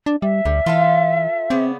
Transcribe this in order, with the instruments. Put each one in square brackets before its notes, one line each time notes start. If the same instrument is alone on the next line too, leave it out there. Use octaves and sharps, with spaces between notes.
[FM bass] D4
[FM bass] G3 [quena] E5
[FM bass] D2 [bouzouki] G3
[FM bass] E3 [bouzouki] F4 A4 F5
[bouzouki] C#3 B3 D5 [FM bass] C4